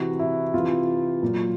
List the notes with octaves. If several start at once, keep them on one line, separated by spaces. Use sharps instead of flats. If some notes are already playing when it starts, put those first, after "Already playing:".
Already playing: C3 E3 F#4
E4
C3 E3 F4
A#2 F#3